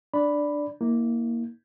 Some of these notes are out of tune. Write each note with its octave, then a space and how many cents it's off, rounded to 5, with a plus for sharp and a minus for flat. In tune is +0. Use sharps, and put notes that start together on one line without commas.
D4 +10 D5 -5 B5 +0
A#3 +0 E4 -30